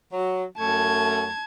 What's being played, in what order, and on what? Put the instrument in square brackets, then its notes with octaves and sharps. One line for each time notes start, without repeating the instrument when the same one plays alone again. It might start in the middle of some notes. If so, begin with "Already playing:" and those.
[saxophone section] F#3
[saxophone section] F#2 A3 [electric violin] A5 G#6